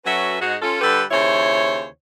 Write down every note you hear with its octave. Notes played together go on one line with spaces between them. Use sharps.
F#3 C#4 F#4 A4 B4 E5
G#2 G#3 F#4
C#4 F4 A4
D3 G3 G4 A4 B4
D#2 C#3 E4 C5 C#5